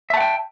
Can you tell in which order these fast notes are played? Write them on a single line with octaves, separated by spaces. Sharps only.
E5 A5 F#5 G5